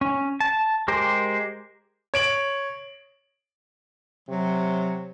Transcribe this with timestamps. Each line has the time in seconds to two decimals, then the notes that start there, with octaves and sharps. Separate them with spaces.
0.01 C#4
0.40 A5
0.88 G#3 G4 A#4 C5
2.14 C#5 D7 F#7
4.29 C3 F#3